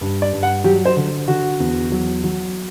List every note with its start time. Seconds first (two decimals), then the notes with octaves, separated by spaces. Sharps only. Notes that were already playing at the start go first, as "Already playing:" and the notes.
0.01 G2
0.22 D5
0.33 G2
0.43 F#5
0.64 F#3 G4
0.85 C5
0.96 D3
1.28 D3 F#4
1.60 E2
1.92 F#3
2.24 F#3